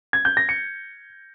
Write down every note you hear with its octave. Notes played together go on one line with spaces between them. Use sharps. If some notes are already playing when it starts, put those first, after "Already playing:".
G#6
G6
A#6
C#7